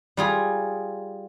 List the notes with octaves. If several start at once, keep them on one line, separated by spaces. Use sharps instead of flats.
G3 F4 G#4